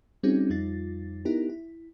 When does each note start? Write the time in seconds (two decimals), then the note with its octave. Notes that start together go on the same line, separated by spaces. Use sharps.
0.23 G3 C4 C#4 D#4 F#4 G#4
0.50 F2 G3 D#4 F4 A6
1.25 B3 D#4 E4 G4 A#4
1.50 E4